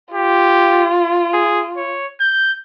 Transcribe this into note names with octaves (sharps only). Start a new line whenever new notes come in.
F4 G4
G#4
C#5
G6